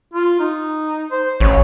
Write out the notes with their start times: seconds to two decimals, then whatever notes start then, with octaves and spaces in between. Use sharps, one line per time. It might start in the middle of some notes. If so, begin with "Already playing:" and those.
0.14 F4
0.40 D#4
1.11 C5
1.40 A1 C#5